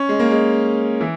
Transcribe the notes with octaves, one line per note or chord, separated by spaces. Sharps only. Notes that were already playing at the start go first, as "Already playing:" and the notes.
Already playing: C#4
G#3
A#3
G#3
E3